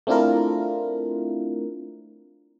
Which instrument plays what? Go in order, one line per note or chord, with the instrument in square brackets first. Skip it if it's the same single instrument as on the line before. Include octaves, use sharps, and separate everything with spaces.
[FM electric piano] A3 C4 D4 E4 F4 A#4